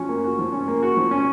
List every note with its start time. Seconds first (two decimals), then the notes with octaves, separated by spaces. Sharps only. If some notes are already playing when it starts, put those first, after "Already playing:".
Already playing: F3 C#4 F#4
0.09 A#3
0.24 F#4
0.39 F3
0.52 C#4
0.68 A#3
0.83 F#4
0.97 F3
1.11 C#4